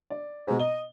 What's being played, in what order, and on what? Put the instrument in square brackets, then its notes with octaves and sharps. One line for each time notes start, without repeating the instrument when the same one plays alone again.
[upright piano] D5
[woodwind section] G#2 [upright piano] B2 A#5
[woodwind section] D#5 [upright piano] G7